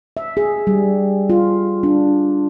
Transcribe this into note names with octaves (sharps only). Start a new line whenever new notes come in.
E5
G#4
G3
F4
D4